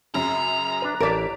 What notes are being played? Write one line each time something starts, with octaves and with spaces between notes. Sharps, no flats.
F#2 C#3 A#5
D4 B4
A1 A#4 D5 A5 B6 D7